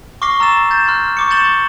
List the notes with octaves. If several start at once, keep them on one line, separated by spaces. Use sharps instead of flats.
C#6 D6 F6 A#6 C7 G7
A#5 E6 A6 E7
G6 A6 E7
C6 F6 F#6
C#6 D6 C#7
G6 A6 E7 F#7 G7